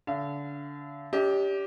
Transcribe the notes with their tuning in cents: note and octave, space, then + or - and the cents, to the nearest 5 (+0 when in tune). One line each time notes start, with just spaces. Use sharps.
D3 -30 F5 -45
D4 -45 G4 +0 D#5 +40